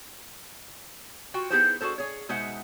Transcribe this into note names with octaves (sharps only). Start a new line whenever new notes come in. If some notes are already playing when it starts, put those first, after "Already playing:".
F4 F#4 G5
B3 D#4 E4 G4 G#4 C5
D4 F#4 G#4 A4 C5
G#4 C#5
B2 G#3 D#4 C5 E5 F#5